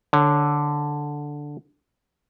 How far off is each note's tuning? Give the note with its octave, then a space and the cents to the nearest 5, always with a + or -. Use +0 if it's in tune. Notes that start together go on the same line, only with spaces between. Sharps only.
D3 +0 C#5 +15